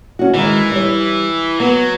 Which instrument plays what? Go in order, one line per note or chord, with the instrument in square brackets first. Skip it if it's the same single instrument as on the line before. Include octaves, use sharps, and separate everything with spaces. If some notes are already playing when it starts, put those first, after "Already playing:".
[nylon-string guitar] C#4 F#4
[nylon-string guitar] D#3 G#3 [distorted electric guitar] E3
[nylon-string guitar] G3 C#5
[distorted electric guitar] F#3 [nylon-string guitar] B3